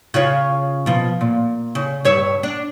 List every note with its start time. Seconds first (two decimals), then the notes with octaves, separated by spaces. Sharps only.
0.14 C#3 F4 C#5
0.86 B2 F3
1.21 A#2
1.75 C#3
2.05 G2 C#5 E5
2.43 D4